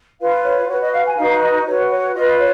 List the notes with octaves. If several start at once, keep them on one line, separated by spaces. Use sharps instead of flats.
F4 B4 F5
C#5
F#4 B4 C#5
D#5
F5
G#5
D#4 F#4 B4 F5
D#5
F#4 B4 C#5
C#5
F4 B4 D#5
C#5